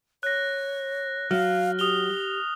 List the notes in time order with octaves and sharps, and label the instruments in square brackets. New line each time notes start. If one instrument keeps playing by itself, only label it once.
[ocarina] C#5 [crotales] F#6 A#6
[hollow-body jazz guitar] F#3 [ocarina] F5 [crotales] F6
[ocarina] G4 [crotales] D#6 F7 G7